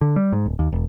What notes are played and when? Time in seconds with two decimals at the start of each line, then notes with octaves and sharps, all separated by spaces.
0.01 D3
0.16 G3
0.32 G#2
0.46 D1
0.59 D#2
0.73 E1